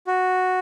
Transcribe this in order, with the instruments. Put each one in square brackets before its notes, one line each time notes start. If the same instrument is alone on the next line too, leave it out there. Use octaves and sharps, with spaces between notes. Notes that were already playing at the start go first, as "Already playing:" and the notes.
[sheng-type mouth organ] F#4